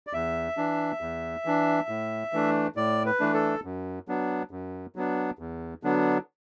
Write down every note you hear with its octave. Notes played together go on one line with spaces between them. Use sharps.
D5
E2 E5
E3 D4
E2
E3 D4
A2
E3 A3 D4
A2 D5
B4
E3 A3 D4
A4
F#2
F#3 B3 D4
F#2
F#3 B3 D4
E2
D3 F#3 B3 D4